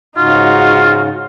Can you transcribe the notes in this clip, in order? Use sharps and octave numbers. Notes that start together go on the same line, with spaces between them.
G#2 C#3 D#4 F4 F#4